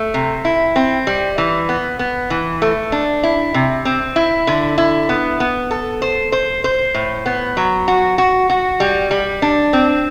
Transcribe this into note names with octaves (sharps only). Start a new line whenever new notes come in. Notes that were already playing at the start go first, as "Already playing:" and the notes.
Already playing: A3
C3
E4
C4
G3
E3
B3
B3
E3
A3
D4
E4
C3
C4
E4
D3
E4
B3
B3
A4
C5
C5
C5
A2
B3
F#3
F#4
F#4
F#4
G3
G3
D4
C4